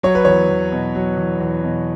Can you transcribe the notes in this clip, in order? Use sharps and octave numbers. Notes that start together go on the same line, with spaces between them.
F#3 C#5
B4
E2 C#5
E2
B2
F#3
E2
E2
B2